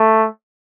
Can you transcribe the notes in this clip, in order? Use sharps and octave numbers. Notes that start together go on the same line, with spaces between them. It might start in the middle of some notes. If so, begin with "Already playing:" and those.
Already playing: A3